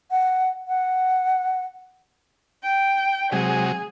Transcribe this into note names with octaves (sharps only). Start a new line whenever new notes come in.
F#5
F#5
G5
C3 F#3 G#3 G#4